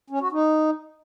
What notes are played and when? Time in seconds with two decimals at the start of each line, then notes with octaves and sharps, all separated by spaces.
0.10 C#4
0.21 F#4
0.32 D#4